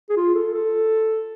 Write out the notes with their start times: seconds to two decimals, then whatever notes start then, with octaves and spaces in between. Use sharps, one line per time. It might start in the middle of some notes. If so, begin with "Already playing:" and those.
0.10 G#4
0.17 F4
0.35 A4
0.54 A4